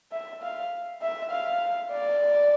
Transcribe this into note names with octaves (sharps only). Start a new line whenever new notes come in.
E5
F5
E5
F5
D5